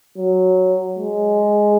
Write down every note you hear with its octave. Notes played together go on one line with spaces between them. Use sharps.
F#3
G#3